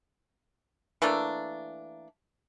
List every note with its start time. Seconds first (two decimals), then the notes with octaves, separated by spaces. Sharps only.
1.02 E3 A3 A#3 D4